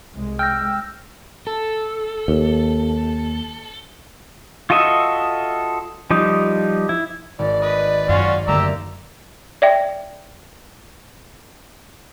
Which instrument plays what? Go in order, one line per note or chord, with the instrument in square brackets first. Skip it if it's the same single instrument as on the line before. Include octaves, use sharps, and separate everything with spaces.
[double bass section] C2 G#3
[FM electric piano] G5 [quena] E6 [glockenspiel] F6 G6 A#6
[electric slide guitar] A4
[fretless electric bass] D#2
[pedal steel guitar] F4 F#4 A4 D#5 E5
F3 G3 D#4
E4
[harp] G#1 [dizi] D5
[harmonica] B4 [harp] D#5
[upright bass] F#2 [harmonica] C#4 F4 F#4
[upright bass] F#2 [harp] D3 A3 A#3 [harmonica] G4 A#5 E6
[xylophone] D5 E5 G5